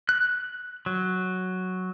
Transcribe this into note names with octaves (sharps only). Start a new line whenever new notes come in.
F#6
F#3